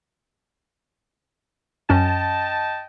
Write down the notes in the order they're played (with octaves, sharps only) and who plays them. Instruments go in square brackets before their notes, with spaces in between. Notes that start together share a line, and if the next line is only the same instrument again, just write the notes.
[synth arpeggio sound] F#2 C#4 [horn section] D#5 G5 A5